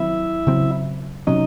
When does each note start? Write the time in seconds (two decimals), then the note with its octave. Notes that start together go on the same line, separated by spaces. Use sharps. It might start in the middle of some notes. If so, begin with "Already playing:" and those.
Already playing: D#3 F#3 C4 E4 E5
0.47 C#3 F#3 C4
1.27 C3 F#3 C#4 D#4 D#5